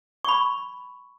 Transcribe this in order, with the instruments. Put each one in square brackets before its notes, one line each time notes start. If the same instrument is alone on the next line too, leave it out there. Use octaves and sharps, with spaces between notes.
[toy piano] B5 C#6